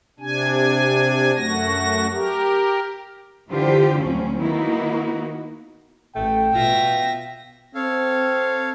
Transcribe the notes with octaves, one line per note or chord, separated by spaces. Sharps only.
C3 D4 G#5
F#2 A3 F#4 A#6
G4 A#4
D3 E3 F4 G4 C5
D2 F#3 C4 C#4
D#3 A#3 B3 D#4 E4 F#4
A1 A3 G5
B2 B3 F4 E5 A#6
C4 A4 C#5 F5